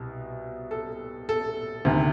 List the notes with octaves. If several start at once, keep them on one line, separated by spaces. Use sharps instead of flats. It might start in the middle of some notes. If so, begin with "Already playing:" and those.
Already playing: C2 B2
A4
A4
D2 C3 D#3